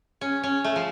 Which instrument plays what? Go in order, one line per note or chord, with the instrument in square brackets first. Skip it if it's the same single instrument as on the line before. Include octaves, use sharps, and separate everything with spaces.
[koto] C#4
C#4
A3
F3